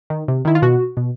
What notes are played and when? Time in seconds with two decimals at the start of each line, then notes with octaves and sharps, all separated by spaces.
0.10 D#3
0.28 C3
0.45 D#3 E4
0.55 F4
0.62 B2 F#4
0.97 B2